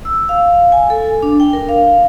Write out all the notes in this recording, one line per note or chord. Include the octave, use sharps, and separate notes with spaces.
E6
F5
G#5
A4
D4
G5
A#4
F5